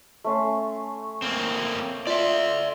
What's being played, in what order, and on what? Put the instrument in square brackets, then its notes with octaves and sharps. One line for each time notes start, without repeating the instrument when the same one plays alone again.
[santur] A3 C#4 C6
[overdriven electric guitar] A#3 C4
[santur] F4 [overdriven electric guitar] D5 E5